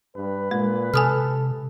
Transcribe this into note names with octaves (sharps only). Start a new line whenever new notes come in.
G2 B4
A#2 G#3
C3 A4 G#5 D#6 F6